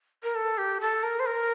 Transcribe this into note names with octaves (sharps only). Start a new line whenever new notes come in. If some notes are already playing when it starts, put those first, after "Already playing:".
A#4
A4
G4
A4
A#4
C5
A#4